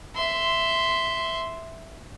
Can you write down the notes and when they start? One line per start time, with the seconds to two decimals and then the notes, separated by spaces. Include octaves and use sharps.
0.16 E5 C6